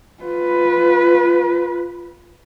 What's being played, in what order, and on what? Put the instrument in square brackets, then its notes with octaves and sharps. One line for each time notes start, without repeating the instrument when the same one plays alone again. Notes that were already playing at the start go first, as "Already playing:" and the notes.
[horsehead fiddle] F4 B4